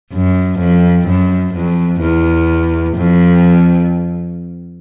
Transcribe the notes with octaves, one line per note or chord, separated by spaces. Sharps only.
F#2
F2
F#2
F2
E2
F2